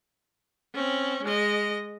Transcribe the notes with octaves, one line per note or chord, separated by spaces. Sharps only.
C4 C#4
G#3 D#5